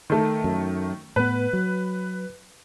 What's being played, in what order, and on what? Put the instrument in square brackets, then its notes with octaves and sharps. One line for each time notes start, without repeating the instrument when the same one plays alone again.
[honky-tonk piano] D#3 A3
[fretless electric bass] F#2
[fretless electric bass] A2 B3 [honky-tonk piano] B4
[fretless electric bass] F#3